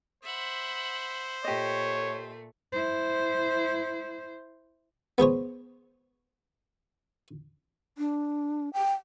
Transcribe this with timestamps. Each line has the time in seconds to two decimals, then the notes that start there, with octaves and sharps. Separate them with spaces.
0.23 C5 E5 F#5 B5
1.44 A#2 A3 G4 C#5 D#5
2.72 E4 C5
5.18 B3 G#4 C5 C#5
7.98 D4
8.73 G5